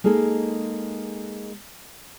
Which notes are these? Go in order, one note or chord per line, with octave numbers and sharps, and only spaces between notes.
G#3 A#3 D#4 G#4 A4